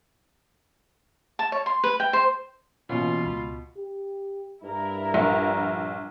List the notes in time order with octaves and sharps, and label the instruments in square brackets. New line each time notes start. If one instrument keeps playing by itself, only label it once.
[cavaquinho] A5
C#5
C6
B4
G5
C5
[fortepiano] B2 [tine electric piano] E3 A#3 C#4 [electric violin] F4
[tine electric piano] C#2 B5
[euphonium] G4
[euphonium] G2 [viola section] E4 A#4
[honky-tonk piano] A#1